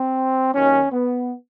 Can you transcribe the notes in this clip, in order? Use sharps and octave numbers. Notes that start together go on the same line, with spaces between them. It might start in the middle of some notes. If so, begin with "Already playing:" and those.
Already playing: C4
D#2 D#3 F#3 C#4
B3